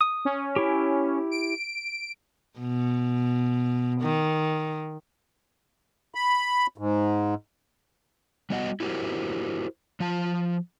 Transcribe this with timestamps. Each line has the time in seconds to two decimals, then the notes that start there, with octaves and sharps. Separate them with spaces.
0.01 D#6
0.25 C#4
0.56 E4 G4
1.31 D7
2.59 B2
4.01 D#3
6.15 B5
6.78 G#2
8.50 G3 B3 F#4 D#5 F#5
8.80 E4 F#4 G4 A#4 C5
10.00 F3 F4 A5